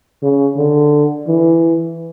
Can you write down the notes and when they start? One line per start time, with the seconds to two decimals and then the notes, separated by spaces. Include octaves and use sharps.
0.23 C#3
0.57 D3
1.28 E3